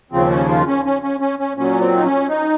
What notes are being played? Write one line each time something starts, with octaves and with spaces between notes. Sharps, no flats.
D#2 C#3 F3 C4
C#4
F4
C#4
C#4
C#4
C#4
C#4
A#2 F#3 C#4
C4
D#4
C#4
D#4